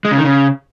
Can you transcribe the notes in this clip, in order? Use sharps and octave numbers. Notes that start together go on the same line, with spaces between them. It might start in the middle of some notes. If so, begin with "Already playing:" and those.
G#3
C#3
D#3
C#3